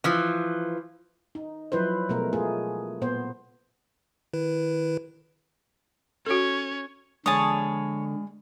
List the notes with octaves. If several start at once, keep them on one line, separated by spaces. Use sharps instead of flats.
E3 F3
D#4
F3 F#3 E4 B4 C5
B2 G#3 A3 A#4
G#3 A3 F4 G#4
A#2 B3 C5
D#3 E4 B4
C#4 F#4 A4 C#5
D3 G#3 G#4 C#5 D5 A5 D#6